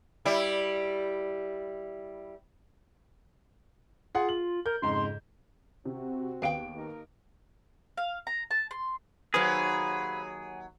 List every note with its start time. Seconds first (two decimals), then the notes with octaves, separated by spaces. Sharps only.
0.25 G3 E4
4.15 F4 G#4 F#5
4.29 F#7
4.66 A#4 G6
4.82 F2 G#2 C#3 C6
5.86 C3 C4 F#4
6.42 D#2 B3 G#4 F5 G5 D7
6.76 A#3 D#4 A#4
7.97 F5
8.27 A#5
8.51 A5
8.71 C6
9.34 D#2 F#3 G#4 B4 C5 F5